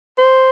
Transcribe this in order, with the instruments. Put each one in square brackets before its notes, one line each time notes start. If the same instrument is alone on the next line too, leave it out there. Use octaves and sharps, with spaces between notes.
[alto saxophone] C5